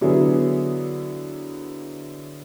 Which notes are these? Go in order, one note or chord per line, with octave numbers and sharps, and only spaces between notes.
D3 F#3 B3 E4 G#4